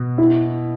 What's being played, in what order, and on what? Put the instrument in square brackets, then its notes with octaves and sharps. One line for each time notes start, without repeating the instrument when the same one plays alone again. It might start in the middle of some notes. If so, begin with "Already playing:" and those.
Already playing: [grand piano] B2
[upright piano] E4